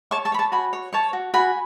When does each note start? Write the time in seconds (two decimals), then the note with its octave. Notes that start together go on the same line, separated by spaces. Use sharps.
0.11 C#5 A5 C#6
0.25 A5 C#6
0.32 C#5 B5
0.39 A5 C#6
0.52 F#4 G#5 B5
0.73 C#5
0.93 C#5 A5 C#6
1.13 F#4
1.34 F#4 G#5 B5